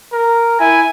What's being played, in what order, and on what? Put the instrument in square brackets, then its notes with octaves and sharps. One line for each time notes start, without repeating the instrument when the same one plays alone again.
[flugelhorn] A#4
[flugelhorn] E4 [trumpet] G#5